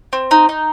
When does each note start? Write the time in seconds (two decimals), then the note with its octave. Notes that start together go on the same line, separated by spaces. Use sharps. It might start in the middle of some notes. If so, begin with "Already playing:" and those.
0.13 C4
0.31 D#4
0.49 D#4